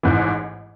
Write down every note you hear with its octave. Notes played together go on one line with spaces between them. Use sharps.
A1 G#2 E3